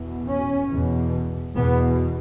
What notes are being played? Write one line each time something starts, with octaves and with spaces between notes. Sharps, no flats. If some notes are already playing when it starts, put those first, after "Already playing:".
Already playing: E2 B2
C#4
E2 B2
E2 B2 B3